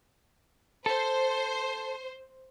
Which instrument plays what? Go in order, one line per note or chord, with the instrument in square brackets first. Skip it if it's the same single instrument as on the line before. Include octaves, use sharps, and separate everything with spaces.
[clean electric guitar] A4 [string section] C5